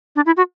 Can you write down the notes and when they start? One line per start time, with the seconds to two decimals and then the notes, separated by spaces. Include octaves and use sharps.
0.16 D4
0.26 E4
0.37 F#4